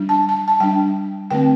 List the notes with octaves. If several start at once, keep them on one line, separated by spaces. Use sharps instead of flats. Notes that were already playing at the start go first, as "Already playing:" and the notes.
Already playing: G3 D4
A5
A5
A5
G3 D4 G5
D3 A3 C4 G5